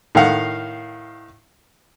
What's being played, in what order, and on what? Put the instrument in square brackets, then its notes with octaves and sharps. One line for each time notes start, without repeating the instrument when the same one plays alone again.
[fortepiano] A2 D#3 F5 F#5